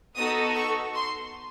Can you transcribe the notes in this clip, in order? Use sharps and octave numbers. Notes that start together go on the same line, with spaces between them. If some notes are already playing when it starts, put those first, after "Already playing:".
B3 D#4 F#4 A4 D#6
C#6
C6